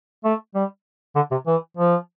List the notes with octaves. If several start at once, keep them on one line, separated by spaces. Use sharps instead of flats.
A3
G3
D3
C3
E3
F3